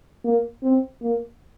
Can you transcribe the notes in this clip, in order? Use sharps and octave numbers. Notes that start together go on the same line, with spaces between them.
A#3
C4
A#3